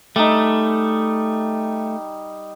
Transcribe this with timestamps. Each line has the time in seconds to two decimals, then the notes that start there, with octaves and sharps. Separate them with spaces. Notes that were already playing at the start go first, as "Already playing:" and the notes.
0.16 G3 A3 D#4